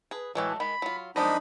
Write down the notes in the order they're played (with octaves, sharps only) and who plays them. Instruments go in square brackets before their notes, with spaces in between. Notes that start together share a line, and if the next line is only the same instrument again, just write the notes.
[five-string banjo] G#4 B4
[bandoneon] A2 E3 [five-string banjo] F#3 G#3 A3
[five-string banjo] D#3 G#3 [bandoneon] B5
[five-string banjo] F#3 F4
[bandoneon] F#2 F3 [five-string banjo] G#3 C4 D#5 [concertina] D4 D#4 B5